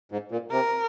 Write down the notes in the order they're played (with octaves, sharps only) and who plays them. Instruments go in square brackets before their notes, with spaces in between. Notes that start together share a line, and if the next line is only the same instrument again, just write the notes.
[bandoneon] G#2
A#2
[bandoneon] C3 [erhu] A#4